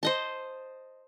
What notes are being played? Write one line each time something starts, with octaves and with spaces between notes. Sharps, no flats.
C5 D#5 A5